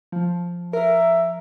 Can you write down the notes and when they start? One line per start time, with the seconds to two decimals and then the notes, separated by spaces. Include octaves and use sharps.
0.12 F3
0.73 A#4 E5